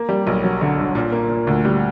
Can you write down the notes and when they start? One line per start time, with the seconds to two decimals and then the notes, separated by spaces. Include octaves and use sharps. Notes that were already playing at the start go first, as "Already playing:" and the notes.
Already playing: A#3
0.09 G3
0.27 B1
0.44 F#3
0.61 D3
0.78 G1
0.95 A#2
1.12 A#3
1.29 A#2
1.47 D2
1.65 G3